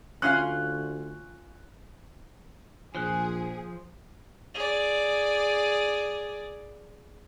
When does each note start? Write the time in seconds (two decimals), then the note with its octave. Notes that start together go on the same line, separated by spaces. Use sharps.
0.22 D2 C#4 F4 F5 F#6
2.95 A#1 F3 G#4 C5 F#6
4.55 G#4 D5